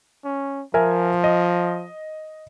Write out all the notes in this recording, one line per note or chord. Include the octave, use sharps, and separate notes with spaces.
C#4
F3 A#4 E5 G#5
D#5